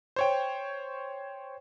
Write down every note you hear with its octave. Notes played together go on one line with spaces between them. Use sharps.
C5 C#5 G5